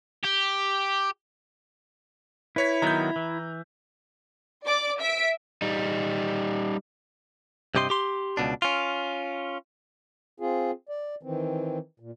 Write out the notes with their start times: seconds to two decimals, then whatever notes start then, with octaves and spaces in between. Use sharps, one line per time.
0.23 G4
2.56 E4 B4 C#5 B6
2.82 D#3 F#3 B3 A#5 G6
3.16 E3
4.65 D5 D6
5.00 E5 B6 D7
5.62 G3 D#4
7.75 G2 C3 G4 D#5 C6
7.90 G4 C6
8.37 C#2 B2 D4
8.62 C#4 F4
10.40 C4 F4 G#4
10.89 D5
11.23 D#3 E3 C4
12.00 A#2